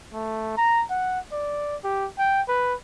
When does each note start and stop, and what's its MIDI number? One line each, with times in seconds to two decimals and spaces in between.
0.13 0.57 57
0.57 0.84 82
0.90 1.19 78
1.32 1.76 74
1.84 2.07 67
2.19 2.42 79
2.49 2.74 71